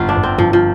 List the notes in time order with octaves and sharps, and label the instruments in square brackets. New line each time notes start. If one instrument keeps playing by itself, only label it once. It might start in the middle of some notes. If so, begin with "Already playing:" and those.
Already playing: [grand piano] G1 [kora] F4
[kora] D4
[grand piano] G1
[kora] C4
[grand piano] G1 [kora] F3
[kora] F3